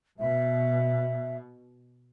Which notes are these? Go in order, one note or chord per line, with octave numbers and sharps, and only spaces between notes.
B2 E5